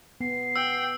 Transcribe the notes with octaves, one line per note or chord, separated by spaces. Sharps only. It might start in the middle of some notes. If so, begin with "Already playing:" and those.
B3 C7
G5 E6